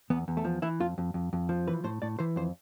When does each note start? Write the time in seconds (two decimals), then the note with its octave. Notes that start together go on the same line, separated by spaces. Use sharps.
0.10 E2 B3
0.28 E2
0.37 A3
0.45 F3
0.62 E3 E4
0.80 F2 F4
0.98 F2
1.14 F2
1.33 F2
1.49 F3
1.68 E3 B4
1.84 A2 C5
2.02 A2 D5
2.19 E3 C5
2.36 F2 C5